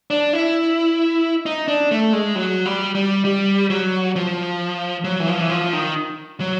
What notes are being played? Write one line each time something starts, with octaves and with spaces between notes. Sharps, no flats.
D4
E4
D#4
D4
A3
G#3
F#3
G3
G3
G3
F#3
F3
F#3
E3
F3
E3
F3
D#3
F#3